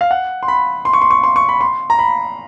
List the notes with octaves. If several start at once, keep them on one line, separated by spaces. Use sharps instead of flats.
F5
F#5
C6
B5
C6
C#6
C6
C#6
C6
C#6
B5
C6
A#5
B5